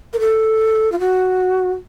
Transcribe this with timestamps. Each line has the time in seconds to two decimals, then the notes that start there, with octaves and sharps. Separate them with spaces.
0.13 A#4
0.19 A4
0.92 F4
0.99 F#4